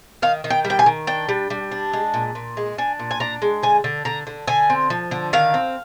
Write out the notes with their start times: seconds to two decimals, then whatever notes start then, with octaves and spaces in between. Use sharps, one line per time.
0.22 D#3 F5
0.44 D#3
0.50 G5
0.65 G3
0.70 G5
0.79 G#5
0.86 D#3
1.07 D4 G5
1.29 G3
1.50 G3
1.71 D4
1.93 G#3
2.14 A#2
2.35 A#2
2.57 G#3
2.78 D4 G#5
2.99 A#2
3.11 G#5
3.20 D4 A#5
3.42 G#3
3.63 D3 G#5
3.84 D3
4.05 D3 A#5
4.27 D3
4.47 D3 G#5
4.70 C4
4.90 F3
5.11 D3
5.33 D#3 F5
5.54 C4